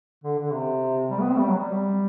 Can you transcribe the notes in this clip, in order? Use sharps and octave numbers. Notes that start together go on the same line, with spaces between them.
D3
D3
C3
G3
B3
C4
A3
G3
F#3
G3